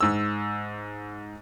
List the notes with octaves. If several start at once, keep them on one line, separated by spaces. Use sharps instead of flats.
G#2 E6